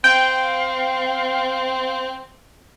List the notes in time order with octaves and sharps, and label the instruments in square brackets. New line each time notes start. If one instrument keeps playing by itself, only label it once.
[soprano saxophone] C4 [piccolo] F5 [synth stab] G5